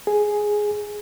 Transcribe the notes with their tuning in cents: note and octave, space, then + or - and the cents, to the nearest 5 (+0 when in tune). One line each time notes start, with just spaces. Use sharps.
G#4 +5